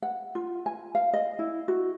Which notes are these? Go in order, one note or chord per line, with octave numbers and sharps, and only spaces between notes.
F#5
F4
G#5
F5
D#5
E4
F#4